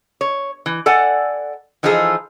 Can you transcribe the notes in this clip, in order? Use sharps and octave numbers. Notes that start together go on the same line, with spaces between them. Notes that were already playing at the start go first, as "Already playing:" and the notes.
C#5
E3
A4 D5 F#5 G#5
E3 F3 D#4 F4 G#4 A4